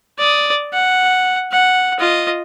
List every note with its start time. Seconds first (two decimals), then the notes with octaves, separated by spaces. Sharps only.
0.19 D5 D#6
0.73 F#5
1.52 F#5
1.99 F4 D#5